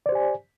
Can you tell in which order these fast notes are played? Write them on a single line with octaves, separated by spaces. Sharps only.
D5 C5 G4 G#5